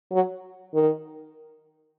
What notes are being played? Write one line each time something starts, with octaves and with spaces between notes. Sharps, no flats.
F#3
D#3